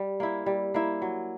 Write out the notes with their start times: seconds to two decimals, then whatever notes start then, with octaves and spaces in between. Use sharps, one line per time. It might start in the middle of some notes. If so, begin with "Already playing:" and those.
Already playing: G3
0.20 A#3 E4
0.46 G3
0.74 A#3 E4
1.02 F#3